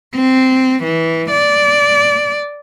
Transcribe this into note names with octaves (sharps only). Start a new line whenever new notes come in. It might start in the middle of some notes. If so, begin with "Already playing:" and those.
C4
E3
D5